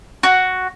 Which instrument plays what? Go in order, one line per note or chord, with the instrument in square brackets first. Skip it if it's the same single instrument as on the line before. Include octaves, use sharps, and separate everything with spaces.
[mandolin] F#4